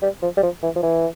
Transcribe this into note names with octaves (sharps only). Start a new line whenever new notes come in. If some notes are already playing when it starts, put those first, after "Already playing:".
G3
F3
G3
F3
E3
F3
E3